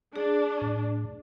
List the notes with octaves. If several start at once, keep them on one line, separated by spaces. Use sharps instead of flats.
D4 G#4
A2